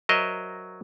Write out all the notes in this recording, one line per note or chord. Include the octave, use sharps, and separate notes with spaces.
F#3 A#4 C5 D#5 E5